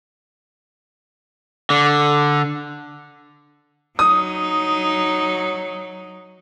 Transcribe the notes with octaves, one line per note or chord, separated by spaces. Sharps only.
D3
F#3 D#4 D#6